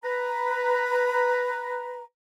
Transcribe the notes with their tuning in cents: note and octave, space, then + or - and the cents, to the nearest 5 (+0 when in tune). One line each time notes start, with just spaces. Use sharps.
B4 +0 A#5 +5